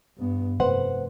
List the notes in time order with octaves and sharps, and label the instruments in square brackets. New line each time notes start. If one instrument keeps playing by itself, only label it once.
[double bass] G2 B3
[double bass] F1 [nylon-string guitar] B4 C5 F#5